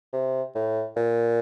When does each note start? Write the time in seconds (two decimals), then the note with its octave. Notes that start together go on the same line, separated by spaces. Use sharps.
0.13 C3
0.55 A2
0.97 A#2